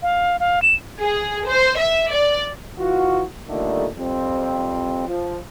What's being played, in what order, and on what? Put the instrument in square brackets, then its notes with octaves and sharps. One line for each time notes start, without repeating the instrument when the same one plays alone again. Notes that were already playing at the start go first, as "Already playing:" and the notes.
[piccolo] F5
F5
E7
[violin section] G#4
C5
E5
D5
[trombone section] E3 F4 F#4
A#2 D3 D#3 G3 A3
F2 F3 G3 C4
F3